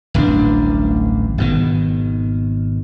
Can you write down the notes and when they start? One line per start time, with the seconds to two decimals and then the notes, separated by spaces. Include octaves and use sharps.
0.14 D1 A1 G2 D4
1.38 G#1 B2 D#3